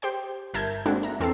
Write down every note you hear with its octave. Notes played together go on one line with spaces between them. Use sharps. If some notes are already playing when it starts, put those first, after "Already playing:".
G4 C5 G5
G1 A#4 E5 A5 G6 G#6
G#3 A#3 C4 D4 F#4 A4
E5 A#5
E2 C4 A4 A5 E6 C7